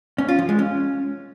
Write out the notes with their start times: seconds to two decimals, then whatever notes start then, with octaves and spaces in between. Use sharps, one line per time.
0.18 C#4
0.28 F4
0.39 F3
0.49 G#3
0.59 C#4